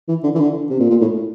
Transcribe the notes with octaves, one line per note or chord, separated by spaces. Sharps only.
E3
D3
E3
D3
C3
A#2
A#2
A2